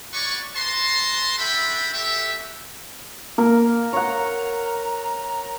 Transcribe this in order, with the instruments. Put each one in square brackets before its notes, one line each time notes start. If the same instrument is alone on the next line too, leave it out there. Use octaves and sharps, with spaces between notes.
[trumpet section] F#4 B4 C#5 D5 C#6
B4 A5 A#5 C6
D4 F#4 A4 E5 G5 B5
F#4 G4 A4 E5
[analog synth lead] A#3 [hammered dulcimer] A#4
[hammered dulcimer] C#5 F#5 [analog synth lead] A#5